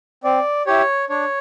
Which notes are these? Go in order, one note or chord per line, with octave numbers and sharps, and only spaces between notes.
C4 D5
E4 G4 C#5
D4 C#5